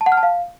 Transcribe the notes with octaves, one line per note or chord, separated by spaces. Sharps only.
A5
F#5
F6
A5
F5